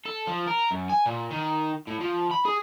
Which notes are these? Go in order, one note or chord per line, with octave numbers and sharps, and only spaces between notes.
A4
F3
A#4
F#2
G#5
A#2
D#3
A2
F3
B5
G#4